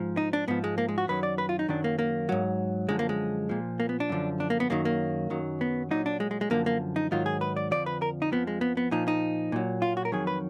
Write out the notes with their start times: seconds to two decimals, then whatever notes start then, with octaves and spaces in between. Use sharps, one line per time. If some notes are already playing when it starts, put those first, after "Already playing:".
Already playing: G#2 F3
0.17 D#4
0.33 D4
0.48 G#2 F3 B3
0.64 G#3
0.78 A#3
0.89 G#3
0.98 F#4
1.08 F#2 D#3 F#3 B4
1.23 D5
1.38 B4
1.49 F4
1.59 D#4
1.68 F#2 D#3 F#3 D4
1.84 A#3
1.99 A#3
2.29 G#2 F#3
2.89 F#2 D3 F3 G#3
2.99 A#3
3.09 G#3
3.49 A#2 F3
3.80 A#3
3.89 B3
4.00 D4
4.09 F#2 D3 F3
4.40 D4
4.50 A#3
4.60 B3
4.70 F#2 D#3 F#3 A#3
4.85 A#3
5.30 F#2 D#3 F#3
5.61 B3
5.91 A#2 F#3 D#4
6.06 D4
6.20 G#3
6.31 G#3
6.41 G#3
6.50 F#2 D3 F3 A#3
6.66 A#3
6.96 D#4
7.11 G#2 D#3 F#3 F4
7.26 G#4
7.41 B4
7.56 D5
7.71 F2 D3 F3 D5
7.86 B4
8.02 A#4
8.22 D#4
8.31 F2 F3 B3
8.47 G#3
8.61 B3
8.77 B3
8.91 A#2 F3 D#4
9.08 D#4
9.52 A#2 F#3
9.82 F4
9.97 F#4
10.05 A#4
10.12 F2 D#3 F#3 G#4
10.27 B4